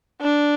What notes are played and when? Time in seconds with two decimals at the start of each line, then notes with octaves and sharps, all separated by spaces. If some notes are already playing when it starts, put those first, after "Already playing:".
0.21 D4